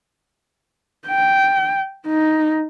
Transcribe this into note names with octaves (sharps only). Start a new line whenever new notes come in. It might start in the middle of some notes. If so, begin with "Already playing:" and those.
G5
D#4